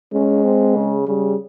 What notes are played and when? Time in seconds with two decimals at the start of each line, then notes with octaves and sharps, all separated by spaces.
0.13 G#3 C#4
0.44 C4
0.76 C#3
1.07 C#3 G3